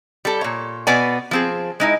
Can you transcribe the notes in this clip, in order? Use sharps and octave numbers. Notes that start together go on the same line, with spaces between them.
G3 A4
A#2 C#5
B2 B3 D5 G#5
F3 C4 G#4
G#3 D#4 E4